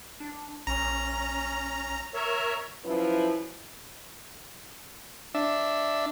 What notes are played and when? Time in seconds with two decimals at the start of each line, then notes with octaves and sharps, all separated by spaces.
0.20 D4
0.67 A#1 C#4 A#5
2.14 A#4 C#5 E5
2.85 F3 F#3 C#4 E4 B4
5.35 D4 E5